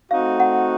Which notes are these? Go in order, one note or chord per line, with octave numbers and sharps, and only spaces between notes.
A3 C4 D#4 F#4 F5
F#5